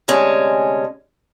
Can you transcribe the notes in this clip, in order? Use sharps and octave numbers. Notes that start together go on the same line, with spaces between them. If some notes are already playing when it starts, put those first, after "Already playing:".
D2 C3 G#3 C#4 D4